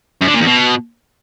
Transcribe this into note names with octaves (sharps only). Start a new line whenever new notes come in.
F#2
D3
A#2
E2
B2